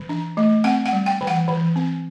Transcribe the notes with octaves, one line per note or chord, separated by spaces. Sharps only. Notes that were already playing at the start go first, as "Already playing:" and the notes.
Already playing: E3
D4
A3
C4 F#5
F#5
G3
G5
E3
F#5
E3
C4